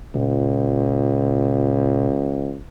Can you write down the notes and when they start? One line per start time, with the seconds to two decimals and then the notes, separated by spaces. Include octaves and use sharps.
0.15 C#2 A#2